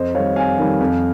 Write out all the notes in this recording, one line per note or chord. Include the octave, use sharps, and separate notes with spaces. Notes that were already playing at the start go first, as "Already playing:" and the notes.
Already playing: F2 C5 D#5
D#3 G3 C#5 F5
F2 F5 G#5
D#3 G3
F2